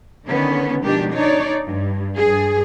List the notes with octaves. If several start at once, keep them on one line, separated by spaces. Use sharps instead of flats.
D3 D#3 B3 C#4
B2 D#3 F3 G#3 D4 G4
D4 D#4 C#5 D5
G2
G2 G#4